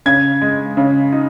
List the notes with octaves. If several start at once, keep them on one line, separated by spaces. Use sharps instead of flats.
C#3 G#6
G#3
C#3
D#4